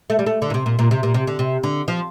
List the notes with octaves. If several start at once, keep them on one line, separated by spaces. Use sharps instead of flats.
A3
G3
A3
D3
A#2
C3
A#2
A#2
C3
A#2
C3
D3
C3
D3
F3